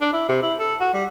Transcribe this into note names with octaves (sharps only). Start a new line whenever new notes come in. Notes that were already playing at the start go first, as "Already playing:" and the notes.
D4
E4
C3
E4
A4
F#4
G3